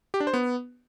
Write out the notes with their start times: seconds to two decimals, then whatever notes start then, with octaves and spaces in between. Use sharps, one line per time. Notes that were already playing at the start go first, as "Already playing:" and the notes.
0.14 G4
0.20 D4
0.27 C5
0.33 B3